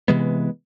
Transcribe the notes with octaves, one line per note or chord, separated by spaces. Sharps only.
C3 E3 G#3 B3